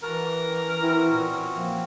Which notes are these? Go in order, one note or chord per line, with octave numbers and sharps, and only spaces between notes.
E3 F#4 A#4 B4 A5
G4
C#4 D6
C4 C#4 E4 F#4
A#2
F3 A#3